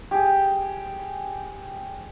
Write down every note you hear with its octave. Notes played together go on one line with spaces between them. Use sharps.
G4 G#4